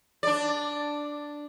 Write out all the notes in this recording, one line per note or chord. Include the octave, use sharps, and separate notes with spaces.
D4 D5